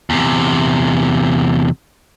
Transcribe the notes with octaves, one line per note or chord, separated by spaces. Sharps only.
E2 C3